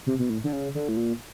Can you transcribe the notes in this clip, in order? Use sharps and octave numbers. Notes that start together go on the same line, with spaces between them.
C3
B2
A2
D3
C#3
D3
A2
A#2